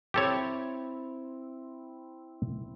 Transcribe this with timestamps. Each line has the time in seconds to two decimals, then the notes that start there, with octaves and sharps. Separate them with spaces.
0.14 C4 E4 G4 A4 C#5